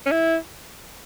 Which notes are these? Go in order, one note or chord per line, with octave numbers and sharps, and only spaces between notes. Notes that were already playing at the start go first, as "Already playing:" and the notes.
C#4
E4